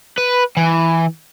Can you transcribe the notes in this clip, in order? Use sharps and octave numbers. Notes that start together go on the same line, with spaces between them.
B4
E3